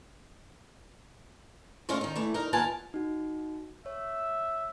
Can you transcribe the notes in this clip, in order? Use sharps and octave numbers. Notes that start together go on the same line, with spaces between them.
G#3 A3 C#4 D#4 F4 A#4
D#3 D#4
E3 A3
D#4 A#4
D#2 B3 F4 A#4 G#5 A5
D#4 F#4
C#5 E5